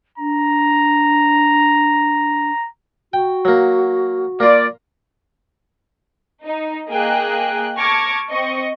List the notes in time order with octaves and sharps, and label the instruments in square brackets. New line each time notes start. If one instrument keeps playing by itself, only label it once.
[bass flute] D4 [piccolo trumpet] A#5
[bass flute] F#4 [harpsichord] G5
[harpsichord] F#3 A#3
[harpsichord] A#3 F4 [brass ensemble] D5
[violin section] D#4
A#3 G#4 D#5 G5 F#6
A5 C#6 D6 F6 G#6 A#6
C4 D#5 C#6